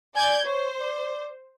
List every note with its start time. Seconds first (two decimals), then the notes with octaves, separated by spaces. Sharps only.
0.16 D5 G#5 G6 G#6
0.45 C5 C#5
0.81 D5